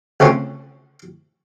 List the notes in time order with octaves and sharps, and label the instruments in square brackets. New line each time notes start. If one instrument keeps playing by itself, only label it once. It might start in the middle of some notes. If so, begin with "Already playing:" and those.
[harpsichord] C#2 A3 C4 C#4